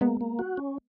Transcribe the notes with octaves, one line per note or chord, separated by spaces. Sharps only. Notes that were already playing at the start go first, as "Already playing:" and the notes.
G#3 A#3 B3
A#3
F#4
C#4